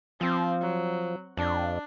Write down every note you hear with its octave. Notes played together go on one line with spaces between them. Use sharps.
F3 C4
F#3
F2 D4